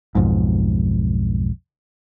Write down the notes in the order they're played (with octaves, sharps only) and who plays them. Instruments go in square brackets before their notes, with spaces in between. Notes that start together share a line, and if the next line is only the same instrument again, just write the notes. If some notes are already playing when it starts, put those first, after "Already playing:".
[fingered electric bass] B1 F2 G#2